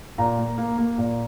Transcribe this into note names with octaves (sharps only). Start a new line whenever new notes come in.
A#2 A#5
A#3
A#3
A#3
A#2